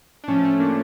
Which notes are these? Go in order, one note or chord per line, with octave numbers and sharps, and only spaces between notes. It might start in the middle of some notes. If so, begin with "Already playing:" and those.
D4
A2 F3 A3 C#4
A3 C#4
A#3 D4